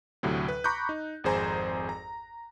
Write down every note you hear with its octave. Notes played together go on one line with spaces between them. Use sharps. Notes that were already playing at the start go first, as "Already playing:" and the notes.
D2 A2 C3 F#3
B4
A#5 B5 C#6 D6 F#6 G6
D#4
G#1 F2 G#4 C5 G#5 A#5
A#5